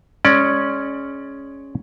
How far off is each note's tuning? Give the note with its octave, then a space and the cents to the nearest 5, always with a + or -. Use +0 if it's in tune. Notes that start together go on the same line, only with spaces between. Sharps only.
G#3 +0 C#4 +0 D5 +20